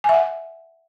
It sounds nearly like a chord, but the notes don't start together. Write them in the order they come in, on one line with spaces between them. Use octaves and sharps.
G#5 E5 F#5